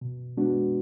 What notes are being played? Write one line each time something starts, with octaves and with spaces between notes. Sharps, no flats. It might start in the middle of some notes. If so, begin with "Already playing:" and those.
B2
G#3 B3 D4 F#4